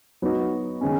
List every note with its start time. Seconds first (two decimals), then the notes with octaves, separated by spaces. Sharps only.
0.22 F#3 B3 D#4 F#4
0.81 D#3 G#3 C#4